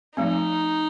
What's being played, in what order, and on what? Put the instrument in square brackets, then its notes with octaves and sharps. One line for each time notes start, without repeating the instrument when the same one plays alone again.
[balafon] F3 A3 C4 [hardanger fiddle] D#4